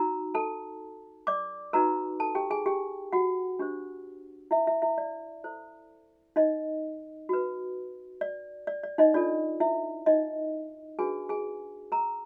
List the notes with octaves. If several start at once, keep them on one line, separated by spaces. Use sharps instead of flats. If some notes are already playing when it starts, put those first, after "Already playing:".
Already playing: D#4 F#4 A#4 A#5
A4 A5
D5 D6
D#4 F#4 A#4 B4 A#5
A4 A5
G4 G5
G#4 G#5
G4 G5
F#4 F#5
D4 G4 C5
E4 E5
E4 E5
E4 E5
D5
E4 A4 C5
D#4 D#5
F#4 B4
D5
D5
D5
D#4 D#5
D4 F4 A4 D5
E4 E5
D#4 D#5
D4 F#4 G#4 B4 G#5
G#4 G#5
A#4 A#5